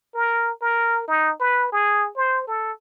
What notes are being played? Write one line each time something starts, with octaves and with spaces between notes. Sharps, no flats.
A#4
A#4
D#4
B4
G#4
C5
A4